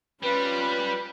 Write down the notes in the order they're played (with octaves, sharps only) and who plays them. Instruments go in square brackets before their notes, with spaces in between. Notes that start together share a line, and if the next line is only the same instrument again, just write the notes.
[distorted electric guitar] G3 [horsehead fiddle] C#4 B5 [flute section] F4 B4